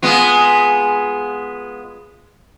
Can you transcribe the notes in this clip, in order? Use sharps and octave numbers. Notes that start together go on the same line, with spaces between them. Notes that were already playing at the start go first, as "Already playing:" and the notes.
G#3 B3 F4